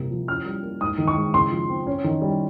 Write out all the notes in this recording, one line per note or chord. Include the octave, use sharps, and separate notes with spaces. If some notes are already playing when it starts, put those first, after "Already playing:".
Already playing: C3 G3 A#3
F3
C#4 F6
G3
A#3
G#2 D#6
D#3
C#6
G#3
C#3 C6
F3
C4
C#4
D#3
G3